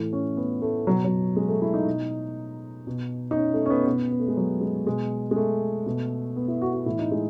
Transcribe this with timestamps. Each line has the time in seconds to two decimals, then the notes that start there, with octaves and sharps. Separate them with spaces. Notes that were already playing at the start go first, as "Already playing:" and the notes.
Already playing: A2 E3 A3
0.13 C#4
0.37 B3
0.62 A3
0.87 B2 F#3
1.04 F#3
1.36 G#3
1.49 A3
1.62 E4
1.74 D#4
1.86 B2
2.87 B2
3.31 D#4
3.36 C#4
3.54 A3
3.66 C#4
3.70 B3
3.86 B2 B3
4.11 B3
4.20 A3
4.28 G#3
4.37 F#3
4.61 G#3
4.86 B2 G#3
5.31 G#3
5.36 A3
5.86 B2
6.36 B3
6.48 E4
6.62 F#4
6.73 F#4
6.86 A2 E3 E4
6.99 D#4
7.11 G#3